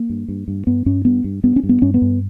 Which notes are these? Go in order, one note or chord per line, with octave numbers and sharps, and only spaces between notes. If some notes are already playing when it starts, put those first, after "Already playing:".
Already playing: A#3
G2
G2
G2
G2 B3
G2 C#4
G2 B3
G2
G2 B3
C#4
G2
B3
G2 C#4
B3
G2